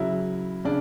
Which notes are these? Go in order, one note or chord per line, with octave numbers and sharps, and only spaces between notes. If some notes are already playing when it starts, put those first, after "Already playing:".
Already playing: C#3 F#3 E4
C#3 D4